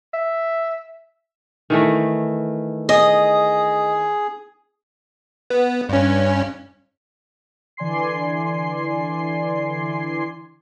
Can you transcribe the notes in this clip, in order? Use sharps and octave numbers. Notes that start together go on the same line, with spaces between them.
E5
D#3 E3 A3
G#4 D#5
B3
G2 C#4
D3 E3 D5 G#5 C6 C7